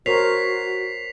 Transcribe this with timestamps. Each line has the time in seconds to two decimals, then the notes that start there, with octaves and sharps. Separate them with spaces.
0.06 F#4 A#4 C5 C#5 B6 C7 F7